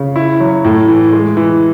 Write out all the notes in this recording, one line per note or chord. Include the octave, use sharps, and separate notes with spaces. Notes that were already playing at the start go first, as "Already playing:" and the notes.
Already playing: C#3
E4
F#3
A2
E3
G#3
E3